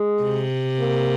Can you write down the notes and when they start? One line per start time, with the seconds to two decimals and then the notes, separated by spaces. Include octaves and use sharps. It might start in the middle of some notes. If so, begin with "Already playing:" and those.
Already playing: G#3
0.22 C3
0.79 A#3